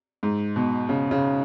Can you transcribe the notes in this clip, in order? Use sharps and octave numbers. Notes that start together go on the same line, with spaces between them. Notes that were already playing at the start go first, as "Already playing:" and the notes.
G#2
B2
C#3
C#3